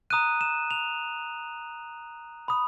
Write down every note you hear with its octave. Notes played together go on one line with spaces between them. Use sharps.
A#5 D#6 F#6 D#7
E7
F7
B5 D#6